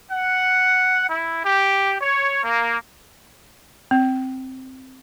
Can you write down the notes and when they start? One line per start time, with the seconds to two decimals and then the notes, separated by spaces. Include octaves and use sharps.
0.11 F#5
1.08 E4
1.44 G4
2.01 C#5
2.43 A#3
3.91 C4